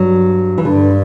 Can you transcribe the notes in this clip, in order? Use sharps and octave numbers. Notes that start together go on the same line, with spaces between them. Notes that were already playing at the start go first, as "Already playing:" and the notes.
Already playing: G2 F#3
E3
G2 D3